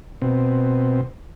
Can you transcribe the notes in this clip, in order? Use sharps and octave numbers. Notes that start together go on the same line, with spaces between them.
B2 C4